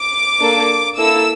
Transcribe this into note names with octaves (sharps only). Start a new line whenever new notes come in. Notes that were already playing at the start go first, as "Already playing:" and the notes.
Already playing: D6
A#3 D4 A4
A#3 E4 A4 E6